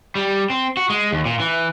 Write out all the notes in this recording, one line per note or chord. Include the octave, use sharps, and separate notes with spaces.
G3
C4
F#4
G#3
D#2
A#2
E3